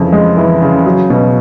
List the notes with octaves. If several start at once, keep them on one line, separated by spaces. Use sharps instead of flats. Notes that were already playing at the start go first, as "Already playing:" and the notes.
Already playing: F2 C#3 E3
G#3
E3
C#3
F#3
B2